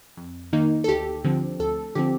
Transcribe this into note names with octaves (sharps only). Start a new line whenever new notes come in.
F2
D#3 A#3 D#4
A4
D2 G4
D3 F3 C4
D2 A4
D3 F3 C4 G4